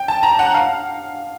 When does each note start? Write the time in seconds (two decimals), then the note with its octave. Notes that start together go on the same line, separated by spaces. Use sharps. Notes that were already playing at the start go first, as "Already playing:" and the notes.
Already playing: G5
0.08 A5
0.23 A#5
0.39 F#5
0.54 F5